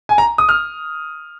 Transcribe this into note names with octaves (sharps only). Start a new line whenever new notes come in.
G#5
A#5
D#6
F6